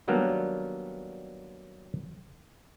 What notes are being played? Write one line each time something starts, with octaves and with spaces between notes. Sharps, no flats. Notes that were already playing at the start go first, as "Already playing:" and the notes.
D#3 F#3 G3 A#3 B3 D4